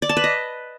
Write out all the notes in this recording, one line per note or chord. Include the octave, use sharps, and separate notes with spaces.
D5
A5
B4
D#5